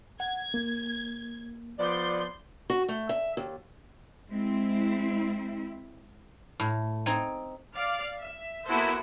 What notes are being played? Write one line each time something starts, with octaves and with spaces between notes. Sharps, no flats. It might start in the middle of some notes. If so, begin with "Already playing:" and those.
F#5 G#6
A#3
F3 B3 D5 C6 G6
F#4
A3
E5
D#2
G#3 C4 E4
A2
C4 D#4 G#5
D5 F5
E5
A#3 B3 E4 F#4 A4 C5